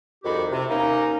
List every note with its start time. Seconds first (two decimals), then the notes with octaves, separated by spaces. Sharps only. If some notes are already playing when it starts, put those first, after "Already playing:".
0.24 C2 F2 D#3 E4 F#4 G4
0.51 C3
0.70 A#3 C#4 D#4